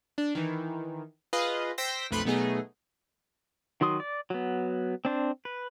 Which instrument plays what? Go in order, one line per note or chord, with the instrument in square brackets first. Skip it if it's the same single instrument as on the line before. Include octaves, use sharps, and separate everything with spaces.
[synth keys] D4
D#3 E3
F4 G#4 B4 D#5 F5
C5 G5 C6 E6 A#6 B6
B1 F2 A3 B4 B5 C6
B2 F#3 A3 B3 D#4 G#4
[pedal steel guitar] D#3 F#3 C6 D#6
D5
F#3 B3
C4 D4 C5
B4